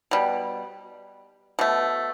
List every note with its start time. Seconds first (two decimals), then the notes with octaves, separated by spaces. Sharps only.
0.11 B2 G3
1.59 B2 A3